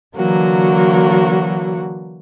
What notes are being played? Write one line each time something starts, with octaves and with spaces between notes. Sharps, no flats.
D3 E3 F#3 A#3 F#4